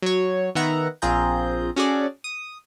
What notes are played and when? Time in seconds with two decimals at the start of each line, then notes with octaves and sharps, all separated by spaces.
0.02 F#3 C#5
0.55 D#3 B3 E5 F#5 A#5
1.02 A#1 C4 F4 G#4 A#5 G6
1.76 C#4 F#4 G#4 A4 D5
2.24 D#6